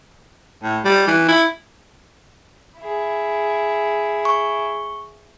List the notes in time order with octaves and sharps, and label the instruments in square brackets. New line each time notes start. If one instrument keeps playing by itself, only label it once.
[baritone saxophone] A2
G3
E3
E4
[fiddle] E4 G#4
[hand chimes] C#6